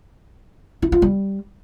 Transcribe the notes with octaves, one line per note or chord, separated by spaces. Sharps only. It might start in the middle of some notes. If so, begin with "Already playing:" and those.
E4
F4
G3